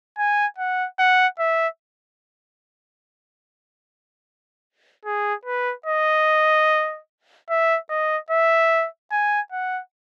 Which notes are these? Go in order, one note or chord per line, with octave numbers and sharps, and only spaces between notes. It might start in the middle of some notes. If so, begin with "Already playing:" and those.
G#5
F#5
F#5
E5
G#4
B4
D#5
E5
D#5
E5
G#5
F#5